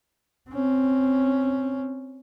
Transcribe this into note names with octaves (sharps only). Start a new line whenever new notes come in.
C4 C#4